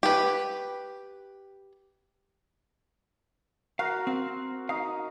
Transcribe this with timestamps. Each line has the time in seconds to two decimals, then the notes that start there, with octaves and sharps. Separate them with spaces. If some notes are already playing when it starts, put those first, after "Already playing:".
0.03 G4 B4
3.79 F#4 A#4 F5
4.07 C4
4.69 D#4 F5